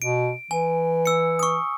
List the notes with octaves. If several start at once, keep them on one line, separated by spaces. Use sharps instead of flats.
B2 D7
E3 G#5
E6 C#7
C#6 D#6